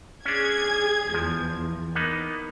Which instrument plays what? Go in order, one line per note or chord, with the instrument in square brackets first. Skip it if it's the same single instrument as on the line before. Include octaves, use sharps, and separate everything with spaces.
[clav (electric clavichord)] C#4 D4 [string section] G#4 G#6
[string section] E2 [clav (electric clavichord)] F3
[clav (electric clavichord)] A#3 B3 D#4